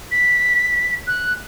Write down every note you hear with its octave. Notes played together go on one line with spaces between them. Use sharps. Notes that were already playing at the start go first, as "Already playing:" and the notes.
B6
F#6